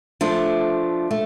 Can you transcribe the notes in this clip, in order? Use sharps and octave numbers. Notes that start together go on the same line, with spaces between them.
F3 A3 D4
A3